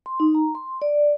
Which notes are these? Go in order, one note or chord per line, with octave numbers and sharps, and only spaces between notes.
C6
D#4
A#5
C6
D5